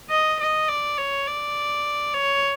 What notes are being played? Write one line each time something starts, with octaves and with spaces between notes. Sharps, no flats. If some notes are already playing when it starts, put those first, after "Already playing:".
D#5
D#5
D5
C#5
D5
C#5